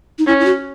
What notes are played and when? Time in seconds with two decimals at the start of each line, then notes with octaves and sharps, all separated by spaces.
0.19 D#4
0.26 C#4 E4
0.40 E4
0.45 F#4